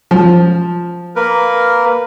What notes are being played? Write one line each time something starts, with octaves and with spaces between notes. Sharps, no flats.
F3
A#3 A#4 B4